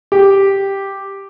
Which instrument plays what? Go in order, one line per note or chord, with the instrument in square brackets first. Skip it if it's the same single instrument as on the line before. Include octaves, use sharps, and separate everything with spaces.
[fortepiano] G4